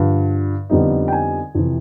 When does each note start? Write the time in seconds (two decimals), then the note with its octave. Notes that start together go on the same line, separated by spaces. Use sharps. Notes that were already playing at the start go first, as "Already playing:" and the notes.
Already playing: G2 D3 F3
0.70 F2 D3 G3 B3 D#4
1.08 G5
1.13 G#5
1.55 F2 C3 E3